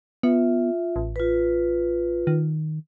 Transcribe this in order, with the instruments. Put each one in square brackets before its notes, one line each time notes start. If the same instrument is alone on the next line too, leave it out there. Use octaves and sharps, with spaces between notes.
[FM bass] B3 [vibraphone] F4 E5
[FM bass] A1
[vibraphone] F4 B4
[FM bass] D#3